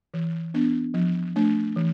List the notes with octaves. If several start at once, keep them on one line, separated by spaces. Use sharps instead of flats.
E3
B3 D4
F3
A3 D4
E3